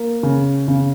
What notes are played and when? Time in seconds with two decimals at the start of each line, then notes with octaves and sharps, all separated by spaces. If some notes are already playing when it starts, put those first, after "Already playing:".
Already playing: A#3
0.23 C#3
0.68 C#3